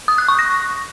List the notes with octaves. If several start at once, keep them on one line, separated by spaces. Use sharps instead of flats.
D#6
F#6
C#6
A#6